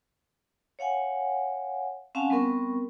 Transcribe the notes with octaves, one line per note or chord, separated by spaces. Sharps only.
C#5 F5 F#5 G#5
C4 C#4 F5 F#5 G#5 A5
G3 B3 C4 A#4 C#6